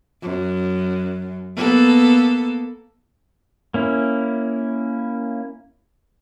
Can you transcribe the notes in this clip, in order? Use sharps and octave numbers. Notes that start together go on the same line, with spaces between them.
F#2
A#3 B3 A4
A#3 C#4 E4